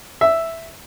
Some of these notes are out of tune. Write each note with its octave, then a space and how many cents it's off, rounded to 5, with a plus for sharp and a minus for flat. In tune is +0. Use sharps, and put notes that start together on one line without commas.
E5 +0